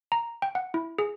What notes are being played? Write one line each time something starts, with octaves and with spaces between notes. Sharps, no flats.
A#5
G5
F#5
E4
G#4